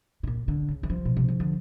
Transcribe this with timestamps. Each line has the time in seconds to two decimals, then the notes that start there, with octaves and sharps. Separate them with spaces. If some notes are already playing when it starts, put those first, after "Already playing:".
0.23 B2
0.27 A#2
0.48 D3
0.68 C#3
0.83 E3
0.90 F3
1.05 B2
1.17 C3
1.28 C#3
1.40 D3